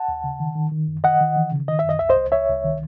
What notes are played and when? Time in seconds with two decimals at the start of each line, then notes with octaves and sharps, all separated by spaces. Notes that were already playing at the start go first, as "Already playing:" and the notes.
Already playing: F#5 A5
0.08 D#2
0.24 C#3
0.40 D#3
0.56 D#3
0.72 D#3
0.88 F#2
1.04 D#3 D#5 F#5
1.20 D#3
1.36 E3
1.52 C#3
1.68 D#3 D#5
1.79 E5
1.84 F#2 D#5
1.99 C2 E5
2.09 C5 D#5
2.16 C2
2.32 C2 C#5 E5
2.48 C2
2.64 D#3